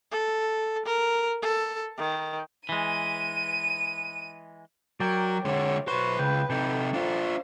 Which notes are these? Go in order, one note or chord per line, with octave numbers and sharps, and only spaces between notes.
A4
A#4
A4
D#3
E3 G#3 D#7
F#3 A#4 D5 G5
D3 G#3 C#5
B1 F#4 B4 C5
C#2 G5
C3 D#4 A4 G5
D4 F4 C5